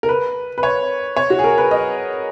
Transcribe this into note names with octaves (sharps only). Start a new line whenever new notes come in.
A#4
B4
B4
C#5
C#5
F#4
G#4
A#4
B4
D#5